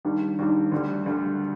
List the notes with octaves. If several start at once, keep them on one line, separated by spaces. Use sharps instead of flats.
D#2 D#3 G3 D4
D#2 D#3 G3 D4
D2 D3 G3
D2 D3 G3